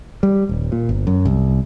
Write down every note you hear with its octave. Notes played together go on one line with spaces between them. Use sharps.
G3
D#1
A#2
G1
F#2
C2